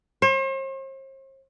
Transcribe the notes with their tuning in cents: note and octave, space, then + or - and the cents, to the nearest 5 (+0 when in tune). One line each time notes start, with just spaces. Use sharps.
C5 +45